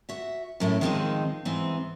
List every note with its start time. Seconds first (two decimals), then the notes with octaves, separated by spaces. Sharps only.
0.09 F#4 E5
0.60 F#2 A2 A3 E4
0.81 D#3 F3 G#3 A3 C4 D#4
1.45 G#2 E3 B3 C4